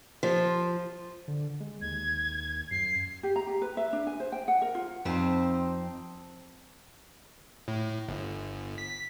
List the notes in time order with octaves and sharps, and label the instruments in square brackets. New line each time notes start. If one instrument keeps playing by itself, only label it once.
[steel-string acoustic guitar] F3
[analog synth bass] D3
G#3
[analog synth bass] D#2 [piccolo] G#6
[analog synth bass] F#2 [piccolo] C7
[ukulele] G4
A#5
G4
B4
E5
D4
G#5
C5
G5
F#5
A#4
F4
[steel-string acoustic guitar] F2 C4 D#4 C5 A5
[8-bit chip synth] A2
G1
B6